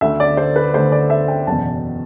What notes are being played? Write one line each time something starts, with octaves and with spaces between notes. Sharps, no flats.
D2 D3 A3 E5
D5
C5
B4
D2 D3 A3 C5
D5
E5
G5
F#1 E2 B2 A5